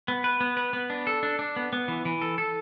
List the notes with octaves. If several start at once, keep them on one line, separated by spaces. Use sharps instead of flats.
B3
B4
B3
B4
B3
D4
A4
D4
D4
B3
B3
E3
E3
A4
A4